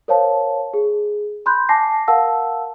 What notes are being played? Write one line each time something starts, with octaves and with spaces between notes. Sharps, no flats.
A#4 C5 C#5 F5 A5
G#4
B5 C6 F#6 G6
G#5 A5 D6 A#6 C7
A#4 F5 F#5 A5 E6